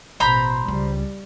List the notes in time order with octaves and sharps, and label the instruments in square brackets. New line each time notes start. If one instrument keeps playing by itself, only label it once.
[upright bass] A1 [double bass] B2 [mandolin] C5 A#5 B5
[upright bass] C#2 C#3 [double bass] G3